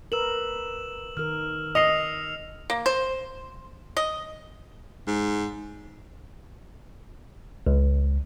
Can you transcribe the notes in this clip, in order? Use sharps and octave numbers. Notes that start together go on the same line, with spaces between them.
A#4 B4 E6 E7 F#7
D#3 A#4 F6
D#5 C7 C#7 F7
A#3
C5
D#5
G#2
C#2